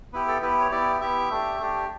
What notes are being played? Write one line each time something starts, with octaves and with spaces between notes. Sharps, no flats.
B3 E4 G4 B4
A4
B3 E4 G4 B4
C#5
B3 E4 G4 D5
B3 E4 G4 E5
A3 D4 G4
A3 D4 G4